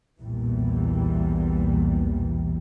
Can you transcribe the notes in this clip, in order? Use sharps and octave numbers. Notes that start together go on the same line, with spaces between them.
B1 E2 A#2 E3 G3